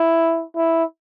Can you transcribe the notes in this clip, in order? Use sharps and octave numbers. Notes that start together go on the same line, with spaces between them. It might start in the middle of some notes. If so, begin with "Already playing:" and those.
Already playing: E4
E4